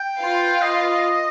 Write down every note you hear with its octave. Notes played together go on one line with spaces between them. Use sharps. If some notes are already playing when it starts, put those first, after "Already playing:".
Already playing: G5
F4 B4 F5
D#5